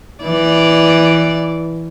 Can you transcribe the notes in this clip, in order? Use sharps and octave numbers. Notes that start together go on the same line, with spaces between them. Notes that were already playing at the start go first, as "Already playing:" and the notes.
E3 D5